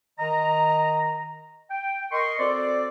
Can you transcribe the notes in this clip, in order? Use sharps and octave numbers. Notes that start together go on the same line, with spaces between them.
D#3 D#5 A#5
G5
A#4 D#5 C6 C#6
C4 F#4 A4 C5 D5